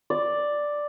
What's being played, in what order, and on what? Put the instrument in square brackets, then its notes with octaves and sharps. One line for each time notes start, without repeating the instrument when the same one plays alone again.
[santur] D5